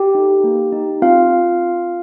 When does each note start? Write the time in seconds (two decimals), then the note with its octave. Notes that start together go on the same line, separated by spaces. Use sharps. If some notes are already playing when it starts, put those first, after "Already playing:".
Already playing: G4 G5
0.15 D#4 A4
0.44 A#3
0.72 D#4 G4
1.02 C4 F4 F5